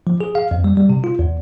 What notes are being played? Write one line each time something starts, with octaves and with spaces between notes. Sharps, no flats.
F3
G#4
F5
F2
G3
G3
C3
F4
E2